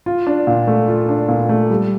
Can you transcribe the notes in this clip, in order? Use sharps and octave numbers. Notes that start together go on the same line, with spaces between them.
F4
D4
A#2
A3
F4
D4
A#2
A3
G3